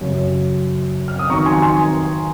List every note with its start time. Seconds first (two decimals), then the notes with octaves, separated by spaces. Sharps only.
0.01 F#2 C#3 F#3
1.08 F6
1.19 D#6
1.30 F2 D#3 F#3 A#5 C#6
1.45 G#5 C6
1.62 G#5 C6